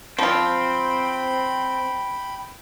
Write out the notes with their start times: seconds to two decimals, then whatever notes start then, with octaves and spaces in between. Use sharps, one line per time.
0.18 F3 C4 F4 G5 B5